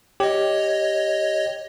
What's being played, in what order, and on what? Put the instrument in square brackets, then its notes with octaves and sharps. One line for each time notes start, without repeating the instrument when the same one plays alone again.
[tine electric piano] G4 [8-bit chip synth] C#5 D#5